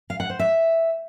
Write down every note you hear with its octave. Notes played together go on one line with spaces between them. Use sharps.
F5
F#5
C5
E5